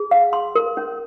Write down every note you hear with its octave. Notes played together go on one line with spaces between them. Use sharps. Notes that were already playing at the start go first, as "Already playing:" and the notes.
Already playing: G#4
F5
C6
A#4
C#4